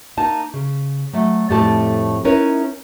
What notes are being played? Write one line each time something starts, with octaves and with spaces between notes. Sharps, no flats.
A#3 D#4 A5
C#3
F#3 A3
F2 A2 G3 A3 A4 A5
C#4 D#4 E4 A#4 B4 C#5